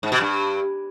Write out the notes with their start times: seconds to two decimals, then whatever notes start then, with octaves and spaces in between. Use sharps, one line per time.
0.03 G#2
0.12 B2
0.21 G2